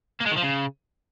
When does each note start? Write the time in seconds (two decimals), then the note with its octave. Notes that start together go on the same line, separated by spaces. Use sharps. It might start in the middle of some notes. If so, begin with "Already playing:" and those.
0.21 A#3
0.27 G#3
0.32 D#3
0.38 F3
0.43 C#3